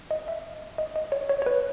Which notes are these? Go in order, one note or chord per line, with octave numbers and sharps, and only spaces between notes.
D#5
E5
D#5
D#5
C#5
C#5
C#5
B4